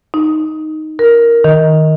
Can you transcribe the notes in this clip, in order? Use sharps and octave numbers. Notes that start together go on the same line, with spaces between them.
D#4
A#4
D#3